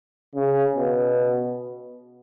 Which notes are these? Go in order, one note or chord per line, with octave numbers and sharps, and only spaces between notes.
C#3
B2